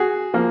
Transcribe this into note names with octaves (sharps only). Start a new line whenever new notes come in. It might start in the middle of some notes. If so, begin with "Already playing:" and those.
Already playing: F#4 G#4
F3 A#3